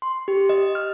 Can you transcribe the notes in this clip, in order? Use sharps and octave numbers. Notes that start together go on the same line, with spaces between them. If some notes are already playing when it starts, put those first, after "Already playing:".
C6
G4
D#5
F6